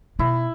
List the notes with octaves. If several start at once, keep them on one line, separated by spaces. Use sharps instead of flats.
B2 E4